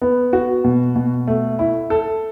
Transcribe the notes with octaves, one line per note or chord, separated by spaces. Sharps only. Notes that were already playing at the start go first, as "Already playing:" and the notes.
B3
F#4
B2
B2
A3
E4
A4